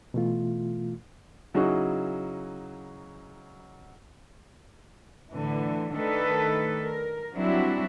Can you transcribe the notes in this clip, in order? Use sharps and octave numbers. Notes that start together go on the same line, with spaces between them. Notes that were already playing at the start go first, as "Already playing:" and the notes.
B2 E3 A3 F4
C#3 F#3 D#4 E4 F#4 G#4
A2 D3 E3
D#3 A3 D4 A4 B4
A#4
F#3 G3 C4 D4 E4 F#4